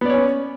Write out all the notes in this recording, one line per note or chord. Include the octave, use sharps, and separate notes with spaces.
B3 C#4 C#5 D5